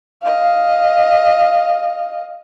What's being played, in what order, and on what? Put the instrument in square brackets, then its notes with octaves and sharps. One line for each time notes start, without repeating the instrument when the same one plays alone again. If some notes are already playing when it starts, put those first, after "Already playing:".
[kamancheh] D#5 F5